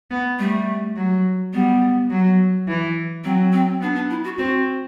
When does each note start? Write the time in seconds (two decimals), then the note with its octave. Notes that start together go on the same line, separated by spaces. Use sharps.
0.11 B3
0.39 G3 A3
0.97 F#3
1.53 G3 B3
2.11 F#3
2.68 E3
3.24 F#3 C4
3.53 C4
3.81 B3 D4
3.95 D4
4.10 E4
4.24 F#4
4.38 C4 F#4